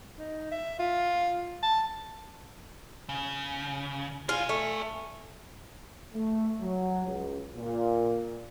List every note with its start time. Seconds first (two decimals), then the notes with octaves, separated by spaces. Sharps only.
0.19 D#4
0.52 E5
0.79 F4
1.62 A5
3.09 C#3
4.29 F4 D5 G#5
4.49 A3
6.14 A3
6.60 F#3
7.06 C#2
7.56 A#2